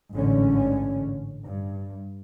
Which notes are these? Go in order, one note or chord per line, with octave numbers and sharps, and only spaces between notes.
A1 G#2 D3 C#4
G2